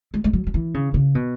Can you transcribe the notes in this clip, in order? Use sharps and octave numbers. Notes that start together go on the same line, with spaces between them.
G#3
G#3
F#3
F#3
E3
C#3
C#3
B2